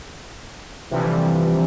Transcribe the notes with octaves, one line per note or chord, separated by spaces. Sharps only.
D2 C3 E3 F3 G3